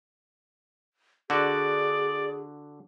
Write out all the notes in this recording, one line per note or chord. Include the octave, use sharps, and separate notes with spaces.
D3 F#4 G#4 D5